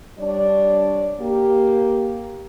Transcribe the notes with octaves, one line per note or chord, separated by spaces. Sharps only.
G3 D4 C#5 D5
A#3 G4